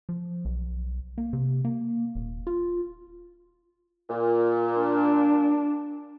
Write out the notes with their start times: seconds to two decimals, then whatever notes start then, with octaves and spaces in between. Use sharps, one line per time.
0.09 F3
0.45 B1
1.18 A#3
1.33 C3
1.65 A#3
2.15 D#1
2.47 F4
4.09 A#2
4.80 D4